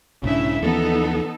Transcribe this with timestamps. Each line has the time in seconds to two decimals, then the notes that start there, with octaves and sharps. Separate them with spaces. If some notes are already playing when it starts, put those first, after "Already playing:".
0.23 B1 G#2 C#3 D4 E4 E5
0.62 D#2 E3 F3 B3 D#4 A4